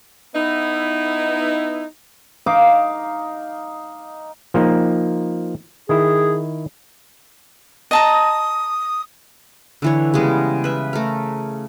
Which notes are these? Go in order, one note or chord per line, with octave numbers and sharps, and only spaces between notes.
B3 D#4 E4
D#4 F5 D6
F3 A#3 D#4
D#3 E4 G#4
D#5 A5 A#5 D#6
D3 E3 C#5
C#3 G3 G#3 B3
B4 E5
A3 A#4